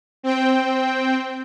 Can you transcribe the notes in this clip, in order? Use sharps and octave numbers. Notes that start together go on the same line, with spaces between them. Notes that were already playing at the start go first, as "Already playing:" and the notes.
C4 G5